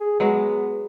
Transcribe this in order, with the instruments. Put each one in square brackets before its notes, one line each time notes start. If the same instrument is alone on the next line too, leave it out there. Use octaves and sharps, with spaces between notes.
[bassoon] G#4
[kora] F#3 G#3 [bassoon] B3